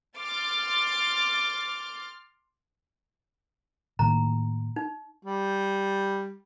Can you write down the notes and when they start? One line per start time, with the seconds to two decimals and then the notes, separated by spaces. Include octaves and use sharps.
0.18 C6 D6 F6 A6
3.99 A2 D#3 A#3 A#5
4.76 D#4
5.24 G3